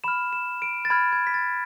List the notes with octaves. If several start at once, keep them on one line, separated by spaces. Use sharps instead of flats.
B5 F6 E7
E7
D7
A6
B5 F6 G#6
G#6
B6
A6